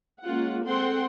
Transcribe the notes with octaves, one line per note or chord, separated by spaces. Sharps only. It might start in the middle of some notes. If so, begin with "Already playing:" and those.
G#3 A#3 C#4 F4 F#5
G#3 C4 A4 F#5 G5 C6